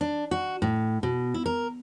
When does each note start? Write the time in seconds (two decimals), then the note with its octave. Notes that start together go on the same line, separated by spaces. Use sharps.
0.01 D4
0.31 F#4
0.62 A2
1.03 B2
1.34 E4
1.46 A#4